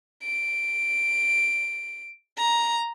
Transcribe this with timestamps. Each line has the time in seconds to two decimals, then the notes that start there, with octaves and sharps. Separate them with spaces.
0.23 D7
2.37 A#5